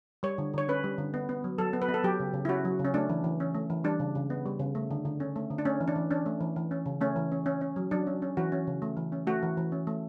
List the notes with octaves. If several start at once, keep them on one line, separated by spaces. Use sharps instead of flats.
G3 C#5
D3
D3 C#5
C#4 B4
G3
D3
B3
B3
F#3
F#3 A4
B3
B4
B3
A4
F#3 G4
C#3
C#3
E4
C#4 F#4
F#3
C#3
C#4
A3 D4
E3
E3
C#4
A3
E3
G3 D4
C#3
C#3
B3
G3
C#3
A3
D3
D3
C#4
A3
D3
D4
A3 C#4
E3
D4
E3
C#4 D4
A3
E3
E3
C#4
C#3
A3 C#4
E3
C#4
C#4
C#4
F#3
F#3 D4
C#4
C#4
E3 F#4
C#4
C#3
A3
E3
C#4
A3 F#4
E3
E3
C#4
A3